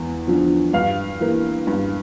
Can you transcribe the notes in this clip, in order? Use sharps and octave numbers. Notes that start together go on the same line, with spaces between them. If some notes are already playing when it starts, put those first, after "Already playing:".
Already playing: E2
D3 F3
G2 F5
E3 A#3
G2